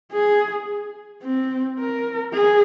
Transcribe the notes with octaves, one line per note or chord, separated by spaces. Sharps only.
G#4
C4
A#4
G#4